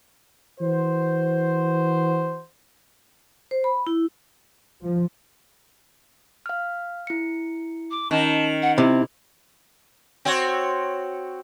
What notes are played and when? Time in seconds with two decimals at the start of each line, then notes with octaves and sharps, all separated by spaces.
0.58 E3 F#4 C5
3.51 C5
3.64 B5
3.87 E4
4.82 F3
6.46 F5 F6
7.07 E4 C#7
7.91 D6
8.11 D#3 C#4 A5
8.62 F#5
8.78 C3 E4
10.25 C4 F#4 C#5